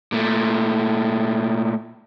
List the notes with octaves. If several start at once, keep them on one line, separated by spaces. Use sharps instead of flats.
A#2 A3